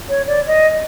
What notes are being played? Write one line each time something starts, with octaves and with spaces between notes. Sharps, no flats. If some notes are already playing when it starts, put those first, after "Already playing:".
C#5
D5
D#5